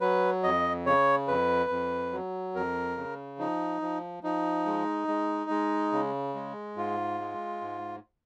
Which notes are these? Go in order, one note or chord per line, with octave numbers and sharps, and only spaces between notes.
F#3 B4
F2 D#5
C#3 C#5
F2 B4
F2
F#3
F2 A#4
C#3
F3 D#4
F3
F3 D#4
G#3
G#3
G#3
C#3
G#3
G#2 F4
G#3
G#2